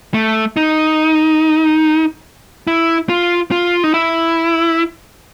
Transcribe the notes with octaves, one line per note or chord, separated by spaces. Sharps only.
A3
D#4
E4
F4
F4
D#4
E4